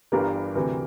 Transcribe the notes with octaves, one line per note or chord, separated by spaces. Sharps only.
G1 G2 E3 G4 A#4
D2 C3 E3